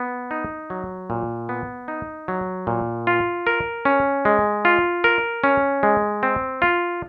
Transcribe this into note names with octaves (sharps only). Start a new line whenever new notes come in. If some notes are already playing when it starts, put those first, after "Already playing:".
Already playing: B3
D#4
F#3
A#2
B3
D#4
F#3
A#2
F4
A#4
C#4
G#3
F4
A#4
C#4
G#3
C4
F4